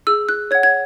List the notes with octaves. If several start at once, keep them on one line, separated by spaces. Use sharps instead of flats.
G#4 E6
F#6
C#5 F#5 G#6
G#6